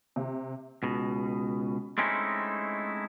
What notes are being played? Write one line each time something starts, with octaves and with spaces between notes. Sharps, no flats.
C3
C#2 B2
G#3 A3 C4 C#4 D#4 E4